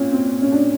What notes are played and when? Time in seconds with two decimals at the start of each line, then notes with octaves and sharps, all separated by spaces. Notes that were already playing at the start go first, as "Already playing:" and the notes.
Already playing: A#2 C4 C#4
0.13 C4
0.42 C#4
0.52 D4